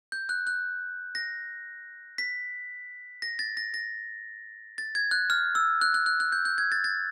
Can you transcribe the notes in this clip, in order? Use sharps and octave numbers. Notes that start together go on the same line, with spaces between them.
G6
F#6
F#6
A#6
B6
A#6
A6
A#6
A#6
A6
G#6
F#6
F6
E6
F#6
F#6
F#6
F#6
G6
G6
G#6
A6
A6